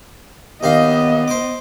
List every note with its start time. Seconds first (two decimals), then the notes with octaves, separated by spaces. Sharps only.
0.63 D#2 B3 D#4 D#5 F5
1.28 C5 D6